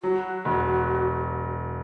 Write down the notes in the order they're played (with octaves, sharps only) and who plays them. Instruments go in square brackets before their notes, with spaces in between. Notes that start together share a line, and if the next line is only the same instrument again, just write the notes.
[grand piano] F#3 [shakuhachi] F#4
[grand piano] E1